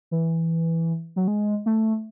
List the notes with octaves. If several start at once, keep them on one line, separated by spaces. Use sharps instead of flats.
E3
F#3
G#3
A3